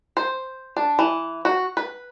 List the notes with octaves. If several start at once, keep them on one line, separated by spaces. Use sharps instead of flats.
C5
D4
E3
F#4
B4